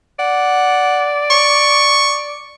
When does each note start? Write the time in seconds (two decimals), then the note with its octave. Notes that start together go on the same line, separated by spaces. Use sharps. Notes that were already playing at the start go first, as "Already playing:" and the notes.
0.19 D5 F#5
1.30 C#6